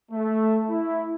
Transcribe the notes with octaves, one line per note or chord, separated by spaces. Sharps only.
A3
E4